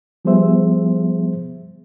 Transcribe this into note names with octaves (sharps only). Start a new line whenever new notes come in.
F3 G3 B3 G#4 C5 E5